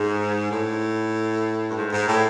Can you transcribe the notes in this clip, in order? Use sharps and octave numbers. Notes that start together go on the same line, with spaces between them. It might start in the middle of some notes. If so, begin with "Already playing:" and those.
Already playing: G#2
A2
G2
G#2
G#2
A2